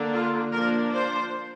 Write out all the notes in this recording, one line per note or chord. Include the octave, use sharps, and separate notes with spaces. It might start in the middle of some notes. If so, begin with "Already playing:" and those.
Already playing: D3 A#3 D4
F4
F3 A#3 D4 A#4
C5